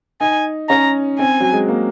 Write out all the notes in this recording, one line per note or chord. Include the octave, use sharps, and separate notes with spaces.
D#4 G#5
C#4 A#5
C4 G#5
F#3
G#3
A#3